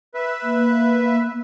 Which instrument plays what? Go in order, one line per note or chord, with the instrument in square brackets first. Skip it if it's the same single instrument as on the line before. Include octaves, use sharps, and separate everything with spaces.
[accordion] B4 E5
[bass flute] A#3